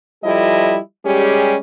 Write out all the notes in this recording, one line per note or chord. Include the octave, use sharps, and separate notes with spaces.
F3 G3 E4 A4 D#5
G3 G#3 C#4 G4 G#4